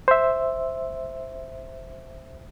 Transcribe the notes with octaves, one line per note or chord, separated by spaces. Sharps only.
C5 E5